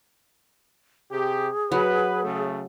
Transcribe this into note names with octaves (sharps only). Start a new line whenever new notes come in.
C3 G4 G#4
F#3 B4
C#3 A3